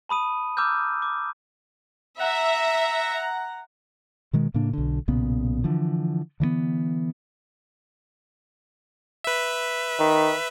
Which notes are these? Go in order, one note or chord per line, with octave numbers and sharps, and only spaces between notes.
A5 B5 D#6 D#7
A#5 D6 E6 F6 G6
D6
E5 F#5 A#5
B2 D#3 G#3
A2 C#3 A#3 D4
B1 D3
B1 A#2 C#3 B3
D3 E3 F3
D3 E3 A3 B3
B4 E5
D#3